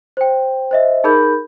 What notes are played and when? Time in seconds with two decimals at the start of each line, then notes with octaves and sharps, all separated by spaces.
0.17 C5 G5
0.71 C5 D#5 E5
1.04 D#4 G#4 A#4 B5 G6